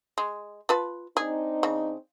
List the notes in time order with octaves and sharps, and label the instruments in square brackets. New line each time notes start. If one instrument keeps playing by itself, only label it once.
[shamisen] G#3
F4 B4 A5
[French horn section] C4 D4 D#4 [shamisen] G#4
[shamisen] C#3